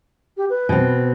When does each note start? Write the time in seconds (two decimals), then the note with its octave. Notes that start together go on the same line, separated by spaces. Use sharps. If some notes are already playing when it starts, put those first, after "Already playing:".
0.37 G4
0.50 B4
0.69 B2 C4